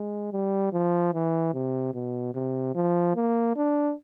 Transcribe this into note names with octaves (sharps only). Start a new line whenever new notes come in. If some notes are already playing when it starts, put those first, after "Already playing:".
Already playing: G#3
G3
F3
E3
C3
B2
C3
F3
A#3
D4